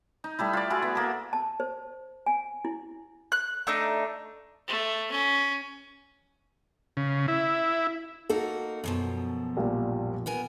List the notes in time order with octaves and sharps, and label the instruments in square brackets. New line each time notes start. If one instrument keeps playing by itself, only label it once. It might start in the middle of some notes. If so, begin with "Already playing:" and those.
[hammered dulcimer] D#4
G3 A3 E4
F4 D5
E4 F#4 G#4
B3
A#3 A4
[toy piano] A5
C5
G#5
E4
[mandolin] F#6
A3 D4 D#4
[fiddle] A3
C#4
[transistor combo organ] C#3
E4
[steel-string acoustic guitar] A#3 D#4 F#4 [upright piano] A4
[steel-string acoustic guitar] F#2 B2 F3
[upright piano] A#1 A#2 G3
[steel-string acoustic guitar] B3 A#4 G#5